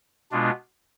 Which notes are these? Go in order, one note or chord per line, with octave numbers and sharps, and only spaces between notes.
B2 G#3 B3 D4 F4